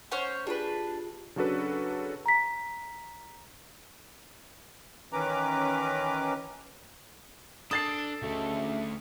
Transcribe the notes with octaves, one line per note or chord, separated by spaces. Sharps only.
C#4 C5 C#5 F#5
D4 F4 G4 G#4 B4
C#3 F#3 D4 F#4 A4 B4
A#5 B6
D#3 E3 C#4 B4 A#5 D6
D4 A4 D#6 A6 C7
D2 C#3 A3 D#5 E5